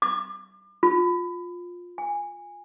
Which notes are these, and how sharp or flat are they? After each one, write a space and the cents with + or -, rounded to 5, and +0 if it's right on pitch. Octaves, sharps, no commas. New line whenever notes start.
D6 +35
F4 +15
G#5 -15